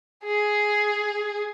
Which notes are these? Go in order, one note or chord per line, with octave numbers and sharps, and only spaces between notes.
G#4